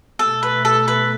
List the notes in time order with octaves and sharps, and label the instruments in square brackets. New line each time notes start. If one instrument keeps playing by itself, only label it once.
[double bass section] B2 A3 [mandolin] A4
[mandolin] B4
A4
B4